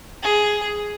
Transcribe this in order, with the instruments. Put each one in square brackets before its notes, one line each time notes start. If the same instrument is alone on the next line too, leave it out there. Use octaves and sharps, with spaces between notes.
[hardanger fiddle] G#4